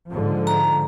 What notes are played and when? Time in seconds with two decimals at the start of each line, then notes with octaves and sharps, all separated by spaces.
0.11 G#2 D3 F3
0.47 A#5